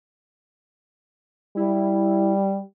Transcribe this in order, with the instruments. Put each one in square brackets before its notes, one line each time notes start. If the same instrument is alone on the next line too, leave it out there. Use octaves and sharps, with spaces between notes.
[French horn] G3 [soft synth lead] E4